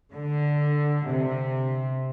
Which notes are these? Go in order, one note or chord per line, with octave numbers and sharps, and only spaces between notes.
D3
C3